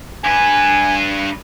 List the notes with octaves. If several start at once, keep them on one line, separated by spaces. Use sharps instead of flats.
G2 B4 G#5